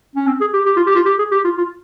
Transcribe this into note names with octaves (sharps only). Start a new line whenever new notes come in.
C#4
C4
G#4
G4
G4
F4
G4
F4
G4
G#4
G4
F4
F4